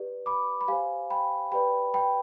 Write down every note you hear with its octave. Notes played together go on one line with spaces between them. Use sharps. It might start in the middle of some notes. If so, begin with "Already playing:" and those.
Already playing: G4 B4 D5
B5 D6
B5
G4 C5 F5 G#5
G5 B5
G4 B4 D5 G5 B5
G5 B5